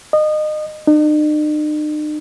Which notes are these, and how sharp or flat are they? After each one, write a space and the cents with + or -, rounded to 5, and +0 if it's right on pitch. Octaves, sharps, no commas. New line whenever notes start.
D#5 -25
D#4 -45